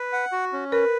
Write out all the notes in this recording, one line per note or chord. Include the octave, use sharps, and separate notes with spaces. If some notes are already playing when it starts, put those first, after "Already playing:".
Already playing: B4
F#5
F#4
C#4
A#4 B4